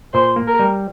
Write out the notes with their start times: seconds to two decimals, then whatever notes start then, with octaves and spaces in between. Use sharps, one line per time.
0.14 A#2 C5
0.36 A#3
0.48 A#4
0.59 G3